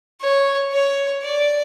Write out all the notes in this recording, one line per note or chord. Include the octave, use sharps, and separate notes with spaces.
C#5
C#5
D5